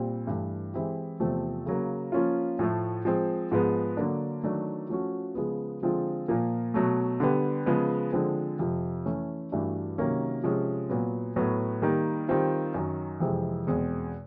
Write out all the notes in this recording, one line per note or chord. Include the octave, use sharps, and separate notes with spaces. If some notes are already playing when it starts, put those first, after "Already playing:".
Already playing: A#2 G3 C4
G2 E3 A3
E3 G#3 C4 E4 G4
E2 C3 F3 A3 C4
C#3 F#3 A#3
F3 A#3 C#4 F4
A2 F3 A3
F3 G#3 C4
G#2 F3 G#3 B3
D3 F#3 A#3 D4
D#3 F#3 A3 D4
F3 A3 C#4 F#4
C#3 F3 G#3 B3
D3 F3 G#3 C4 F4
A#2 F3 A#3
B2 F#3 A3
D3 G3 B3
C#3 F3 G#3 B3
D3 F3 G#3 C4
F2 C3 F3
E3 A3 C#4
G2 E3 A3 D4 F#4
C3 D#3 F#3 A#3 C#4
C3 F3 G#3 C#4
A#2 F#3 B3
A2 F#3 B3
D#3 G3 A#3
D#3 G3 C4 F4
F#2 D#3 F#3
F2 C3 E3 G#3 C4
E2 B2 G#3 C4